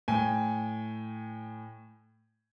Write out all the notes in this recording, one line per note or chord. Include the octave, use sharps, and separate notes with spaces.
A2 G5 G#5